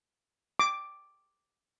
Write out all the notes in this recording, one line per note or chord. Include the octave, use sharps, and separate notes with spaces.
D6